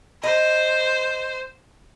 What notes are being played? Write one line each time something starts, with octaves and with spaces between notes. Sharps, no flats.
C5 D#5